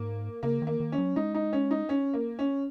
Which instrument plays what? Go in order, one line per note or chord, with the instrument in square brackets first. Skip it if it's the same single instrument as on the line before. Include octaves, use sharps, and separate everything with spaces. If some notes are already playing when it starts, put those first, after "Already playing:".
Already playing: [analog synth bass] G#2 [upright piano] A#3
[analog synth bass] C#3 [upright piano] A#3
[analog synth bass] D#3
[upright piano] A#3
[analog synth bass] D#3
[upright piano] C#4
[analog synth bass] F#3
[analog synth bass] G#3 [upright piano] D#4
[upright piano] D#4
C#4
D#4
C#4
A#3
C#4